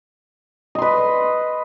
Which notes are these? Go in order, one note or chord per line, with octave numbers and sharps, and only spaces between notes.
B4 D#5 C6